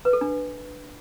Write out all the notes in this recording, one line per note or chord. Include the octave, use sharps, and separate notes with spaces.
B4
A4
D4